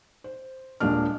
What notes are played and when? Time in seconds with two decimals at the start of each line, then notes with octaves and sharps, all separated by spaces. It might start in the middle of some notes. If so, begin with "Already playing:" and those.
0.24 C5
0.80 D#1 A#2 G#3 D4 F6